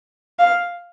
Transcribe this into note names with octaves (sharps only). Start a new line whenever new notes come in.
F5